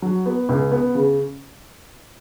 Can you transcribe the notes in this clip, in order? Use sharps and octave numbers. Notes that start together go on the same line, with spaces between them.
F#3
B3
C#2
B3
C#3